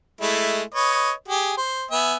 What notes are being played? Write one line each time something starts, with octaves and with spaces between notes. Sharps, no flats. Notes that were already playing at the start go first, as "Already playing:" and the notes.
G#3 A3 E4
B4 C#5 D#5
G4 G#4
C5
B3 E5 G#5